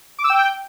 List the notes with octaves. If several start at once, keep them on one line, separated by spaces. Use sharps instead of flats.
D6
E6
G5